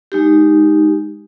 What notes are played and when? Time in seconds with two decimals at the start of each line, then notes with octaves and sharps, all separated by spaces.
0.12 G#3 D#4 G4